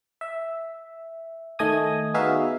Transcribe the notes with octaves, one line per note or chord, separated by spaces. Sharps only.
E5
D#3 A3 D#5 G#5 D#6
B3 D#4 F#4 G#4 E5 F5